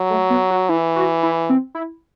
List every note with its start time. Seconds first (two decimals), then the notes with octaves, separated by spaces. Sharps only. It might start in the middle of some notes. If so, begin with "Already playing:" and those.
Already playing: F#3
0.10 A3
0.30 B3
0.50 F#4
0.69 E3 E4
0.96 F#4
1.23 E4
1.49 C4
1.75 E4